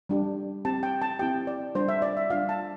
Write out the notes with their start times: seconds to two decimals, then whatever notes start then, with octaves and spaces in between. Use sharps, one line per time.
0.09 G3 D4 G4
0.65 C4 E4 G4 A5
0.83 G5
1.02 A5
1.19 C4 E4 G4 G5
1.47 D5
1.75 G3 D4 F4 C5
1.89 E5
2.02 D5
2.17 E5
2.30 G3 D4 F4 F5
2.49 A5